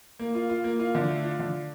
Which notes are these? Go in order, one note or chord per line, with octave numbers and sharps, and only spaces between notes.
A#3
F4
F4
A#3
F4
D3
A3
F4
D3